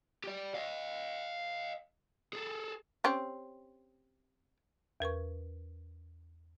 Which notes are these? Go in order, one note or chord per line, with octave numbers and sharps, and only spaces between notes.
G4 D5
D#5 F5
G#4 A4
C4 C#4 G4
E2 A#4 B4 C#6